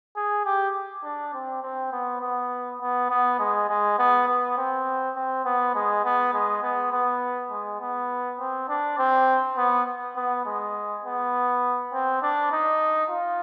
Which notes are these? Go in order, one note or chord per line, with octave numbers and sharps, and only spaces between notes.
G#4
G4
D4
C4
C4
B3
B3
B3
B3
G#3
G#3
B3
B3
C4
C4
B3
G#3
B3
G#3
B3
B3
G#3
B3
C4
D4
C4
B3
B3
G#3
B3
C4
D4
D#4
F4